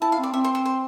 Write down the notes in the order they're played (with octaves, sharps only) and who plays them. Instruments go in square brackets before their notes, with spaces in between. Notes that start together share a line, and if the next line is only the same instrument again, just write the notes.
[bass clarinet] E4 [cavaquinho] A5
[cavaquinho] F5
[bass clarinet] C4
[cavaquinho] D5
[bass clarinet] C4 [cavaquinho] E5
[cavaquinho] C5
C5
C5